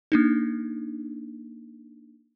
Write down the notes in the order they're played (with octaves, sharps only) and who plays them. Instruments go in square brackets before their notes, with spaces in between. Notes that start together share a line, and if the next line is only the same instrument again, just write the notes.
[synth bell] A#3 D4 D#4